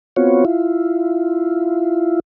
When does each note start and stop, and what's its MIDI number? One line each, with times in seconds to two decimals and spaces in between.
0.16 0.45 59
0.16 0.45 60
0.16 0.45 65
0.16 0.45 66
0.16 0.45 73
0.45 2.20 64
0.45 2.20 65